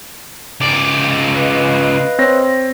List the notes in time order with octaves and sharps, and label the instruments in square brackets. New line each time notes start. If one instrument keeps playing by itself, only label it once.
[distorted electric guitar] C#2 D5
[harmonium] B4 D#5 F5
[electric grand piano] C4 C#5 A#6